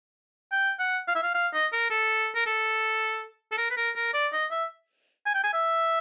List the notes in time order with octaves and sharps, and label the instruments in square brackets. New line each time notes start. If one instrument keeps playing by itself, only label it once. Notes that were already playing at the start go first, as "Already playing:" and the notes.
[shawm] G5
F#5
F5
E5
F5
F5
D#5
A#4
A4
A#4
A4
A4
A#4
B4
A#4
A#4
D5
D#5
E5
G#5
G5
G#5
E5